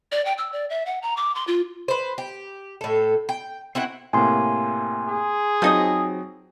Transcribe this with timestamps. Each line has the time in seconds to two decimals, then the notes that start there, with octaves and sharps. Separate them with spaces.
0.12 D5
0.25 G5
0.38 E6
0.53 D5
0.70 E5
0.86 F#5
1.02 A#5
1.17 D6
1.35 C6
1.47 F4
1.88 B4 C5
2.18 G4
2.81 A2 A4
3.29 G5
3.75 C4 E4 F#4 F#5
4.13 A2 C3 A#3 G#5 C6
5.09 G#4
5.62 F3 F#3 C4 D#4 D#5